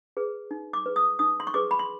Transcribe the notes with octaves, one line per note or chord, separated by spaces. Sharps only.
G#4 B4
D#4
D6
G#4 B4
D#6
D#4 D#6
C6
C#6
G#4 B4 D6
B5
C6